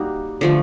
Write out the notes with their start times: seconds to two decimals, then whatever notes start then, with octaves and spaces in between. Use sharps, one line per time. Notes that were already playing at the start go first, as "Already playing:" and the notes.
Already playing: G3 A#3 D#4 F#4
0.41 D3 F3 A3